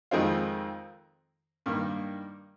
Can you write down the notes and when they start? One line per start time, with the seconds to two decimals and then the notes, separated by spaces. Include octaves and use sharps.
0.11 F2 D#3 G#3 C4 F4
1.66 G2 D#3 A#3